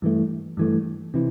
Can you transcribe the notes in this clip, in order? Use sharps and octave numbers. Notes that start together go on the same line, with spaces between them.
G2 E3 A3
G2 E3 A3
C3 E3